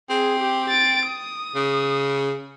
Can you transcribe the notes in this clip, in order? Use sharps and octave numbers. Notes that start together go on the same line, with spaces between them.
C4 G#4
G4
A6 D7
D#6
C#3